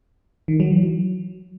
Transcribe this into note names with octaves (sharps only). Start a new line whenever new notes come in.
D#3
F#3
E3
F#3